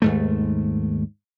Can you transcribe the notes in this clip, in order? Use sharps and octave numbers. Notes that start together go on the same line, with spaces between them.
D#2 G#2 A3